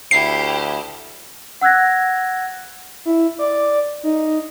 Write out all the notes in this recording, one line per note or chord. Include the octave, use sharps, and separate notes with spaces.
D2 E4 G4 C7
F#5 E6 F#6 G#6 A#6
E4
D5
D#4